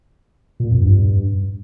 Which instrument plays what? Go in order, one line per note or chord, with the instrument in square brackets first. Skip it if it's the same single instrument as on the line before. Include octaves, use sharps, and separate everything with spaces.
[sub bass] A#2
F2
G2